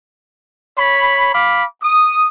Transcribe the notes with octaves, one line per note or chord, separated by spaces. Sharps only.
C#5 B5
F5 B5 D6
D#6